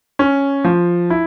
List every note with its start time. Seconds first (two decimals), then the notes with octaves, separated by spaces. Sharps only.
0.19 C#4
0.64 F3
1.10 E4